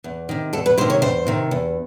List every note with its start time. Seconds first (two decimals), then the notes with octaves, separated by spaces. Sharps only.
0.04 E2
0.29 C3 D#3
0.53 E2 A4
0.66 B4
0.78 C3 C5
0.81 D#3
0.90 C#5
1.02 E2 C5
1.27 C3 D#3
1.51 E2